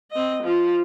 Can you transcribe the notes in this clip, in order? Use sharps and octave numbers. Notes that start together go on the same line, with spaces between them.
C4 D#5
F3 F4